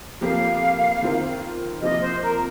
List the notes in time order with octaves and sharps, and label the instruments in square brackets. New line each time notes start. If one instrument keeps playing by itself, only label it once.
[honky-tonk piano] F2 F3 A#3 G4 A#4 [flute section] F5
[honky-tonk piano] D#3 C4 F4 A#4
[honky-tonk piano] C3 F3 A#3 F4 [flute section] D#5
[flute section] C5
A#4